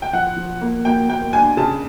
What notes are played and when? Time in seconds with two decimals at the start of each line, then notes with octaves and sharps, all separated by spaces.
0.02 G5
0.13 F3 F#5
0.37 F3
0.61 A#3
0.85 A#3 G5
1.09 A#3 G5
1.33 D4 G#5
1.57 C#3 A5